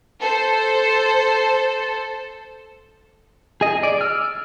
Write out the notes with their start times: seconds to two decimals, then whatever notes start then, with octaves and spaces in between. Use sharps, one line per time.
0.20 A4 C5
3.61 G#4 D#5
3.83 D5
4.01 E6 F6